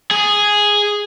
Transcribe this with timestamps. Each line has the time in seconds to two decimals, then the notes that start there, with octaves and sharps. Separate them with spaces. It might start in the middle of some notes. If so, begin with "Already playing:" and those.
0.11 G#4